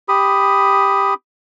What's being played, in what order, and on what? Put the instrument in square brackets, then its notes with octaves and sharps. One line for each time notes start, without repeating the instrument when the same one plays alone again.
[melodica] G4 B5 D#6